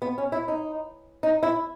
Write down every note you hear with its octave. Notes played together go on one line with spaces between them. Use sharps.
B3
C#4
E4
D#4
D#4
E4